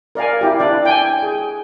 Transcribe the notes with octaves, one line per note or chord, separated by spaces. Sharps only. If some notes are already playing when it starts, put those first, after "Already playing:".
A#4 D5 F5 G#5
E4 G4
D4 E4 D5
G5 G#5
G#4